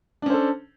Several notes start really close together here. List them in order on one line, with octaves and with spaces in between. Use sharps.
D4 C#4 C5 A4